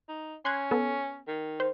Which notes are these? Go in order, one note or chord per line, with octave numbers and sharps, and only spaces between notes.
D#4
C#4 C6 F#6 G#6
B3 A4
D#3
C5